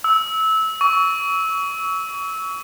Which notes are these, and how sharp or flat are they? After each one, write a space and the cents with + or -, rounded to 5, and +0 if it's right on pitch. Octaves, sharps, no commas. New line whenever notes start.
E6 -20
C#6 +30